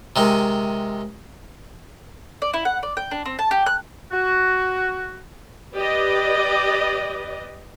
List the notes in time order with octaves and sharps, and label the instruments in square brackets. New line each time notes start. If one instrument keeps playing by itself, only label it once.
[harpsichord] C3 D#3 G#3
[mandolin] D5
E4
F#5
D5
G5
D4
C4
A5
G4
F#6
[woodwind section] F#4
[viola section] G4 B4 D5 D#5